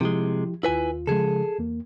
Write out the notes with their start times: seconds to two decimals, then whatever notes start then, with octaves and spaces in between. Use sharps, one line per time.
0.01 C3 F3 G#3 E4 G4
0.63 D#2 E4 F4 B4 G#5
1.07 C#3 F3 G#3 G#4 A4
1.59 E2 A#3